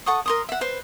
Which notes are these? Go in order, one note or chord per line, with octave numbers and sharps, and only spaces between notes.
A4 F#5 C#6 D#6
A#4 C6 D#6
E5 F#5
B4 C5